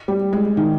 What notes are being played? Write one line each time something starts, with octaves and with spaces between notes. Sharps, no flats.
G3
G#3
D#3